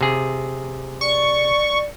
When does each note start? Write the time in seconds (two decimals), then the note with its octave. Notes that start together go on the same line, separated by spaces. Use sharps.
0.01 C3 G#4
1.01 D5 C#6